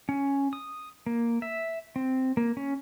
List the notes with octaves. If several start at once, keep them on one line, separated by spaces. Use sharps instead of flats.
C#4
D#6
A#3
E5
C4
A#3
C#4